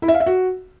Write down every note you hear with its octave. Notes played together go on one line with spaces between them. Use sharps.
E4
E5
F5
E5
F#4